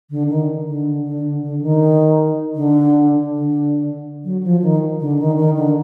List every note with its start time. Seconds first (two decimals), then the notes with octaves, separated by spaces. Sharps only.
0.10 D3
0.29 D#3
0.67 D3
1.05 D3
1.43 D3
1.61 D#3
2.55 D3
3.30 D3
4.24 F#3
4.43 F3
4.62 D#3
5.00 D3
5.19 D#3
5.37 D#3
5.56 D3